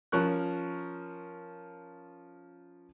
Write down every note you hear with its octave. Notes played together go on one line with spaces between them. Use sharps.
F3 C#4 A#4 C#6 F#6